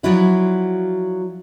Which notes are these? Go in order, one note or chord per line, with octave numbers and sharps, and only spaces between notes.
F3 F#3 D4 E4 F#4